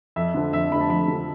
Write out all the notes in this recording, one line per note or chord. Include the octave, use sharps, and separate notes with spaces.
F2 E5
D3 F3
F2 E5
D3 F3 B5
A5
F2 B5
D3 F3